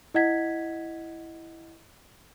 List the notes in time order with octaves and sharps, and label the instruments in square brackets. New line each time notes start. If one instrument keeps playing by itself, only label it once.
[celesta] E4 D#5 F#5 G#6 B6